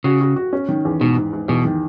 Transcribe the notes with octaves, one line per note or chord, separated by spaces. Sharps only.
C#3 F#4
F#4
F#4
C#4
D#3
E2
G#2 B2
G#2
G#2
E2 B2
D#3